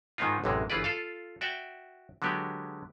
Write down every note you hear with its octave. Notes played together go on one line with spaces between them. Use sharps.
G#2 D#3 G#3 B3 D#4 F4
A1 F#2 C3 E3 G#3
G1 E3 F4 G#4 B4 D5
F4 A4 F5
F#4 D5 E5 G5
D3 F#3 G#3 B3 G4